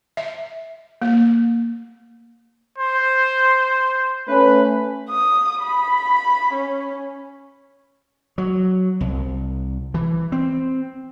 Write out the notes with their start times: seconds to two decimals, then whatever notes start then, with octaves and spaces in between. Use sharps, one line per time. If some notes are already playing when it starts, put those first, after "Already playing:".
0.17 E5
1.02 A#3
2.79 C5
4.28 A3 C#4 B4
5.09 D#6
5.63 B5
6.54 C#4
8.38 F#3
9.01 C2
9.94 E3
10.32 C4